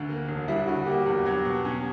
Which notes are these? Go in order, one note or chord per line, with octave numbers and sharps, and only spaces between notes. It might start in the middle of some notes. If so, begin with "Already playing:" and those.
Already playing: D2 D3
A#3
E1
G3 E4
D3 F#4
A#3 G4
E2
F#3
B2
C#4